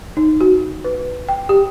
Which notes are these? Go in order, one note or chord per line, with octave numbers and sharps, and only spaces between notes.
D#4
F#4
B4
G5
G4